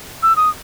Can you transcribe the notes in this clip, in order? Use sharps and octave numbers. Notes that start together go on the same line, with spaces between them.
E6
D#6